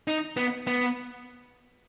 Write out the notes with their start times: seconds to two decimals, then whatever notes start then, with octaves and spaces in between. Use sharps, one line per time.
0.08 D#4
0.37 B3
0.67 B3